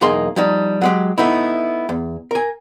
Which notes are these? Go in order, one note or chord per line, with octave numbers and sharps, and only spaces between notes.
B1 E2 A#3 D#4 G#4 C6
F3 G3 D#4
F#3 G#3 G4
A3 B3 D#4 E4
E2
A#4 G#5